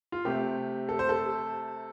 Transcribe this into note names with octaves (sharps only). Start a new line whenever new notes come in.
F4
C3 A3 G4
A4
C5
A4